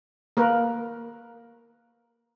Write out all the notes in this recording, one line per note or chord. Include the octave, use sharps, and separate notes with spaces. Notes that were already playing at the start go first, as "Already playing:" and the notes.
A#3 A#4 B4